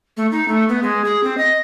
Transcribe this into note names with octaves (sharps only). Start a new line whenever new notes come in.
A3
D#4
A3
B3
G#3
G#4
C4
D#5